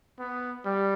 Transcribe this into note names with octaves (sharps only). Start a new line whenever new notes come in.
B3
G3